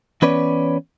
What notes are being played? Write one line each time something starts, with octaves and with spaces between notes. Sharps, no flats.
E3 B3 C#4 B4 C#5 D5